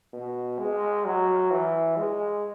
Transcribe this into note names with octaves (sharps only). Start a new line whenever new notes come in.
B2
G#3
F#3
E3
G#3